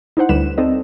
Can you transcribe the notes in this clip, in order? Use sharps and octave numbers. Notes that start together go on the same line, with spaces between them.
D#4 E4 C5 F#5
D2 G3 B4 E7
C4 D#4 A4 D5 D#5